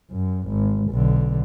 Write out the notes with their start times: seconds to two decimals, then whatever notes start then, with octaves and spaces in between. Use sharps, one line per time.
0.11 F#2
0.48 G#1
0.91 B1 D3